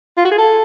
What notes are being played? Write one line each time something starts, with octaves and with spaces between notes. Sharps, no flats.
F4
F#4
G#4
A4